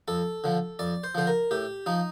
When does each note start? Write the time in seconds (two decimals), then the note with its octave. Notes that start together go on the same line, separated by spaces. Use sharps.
0.08 F2 A4
0.44 D3 F3
0.79 F2 D5
1.04 C5
1.15 D3 F3 C5
1.27 A#4
1.51 A2 G4
1.86 F3 D#4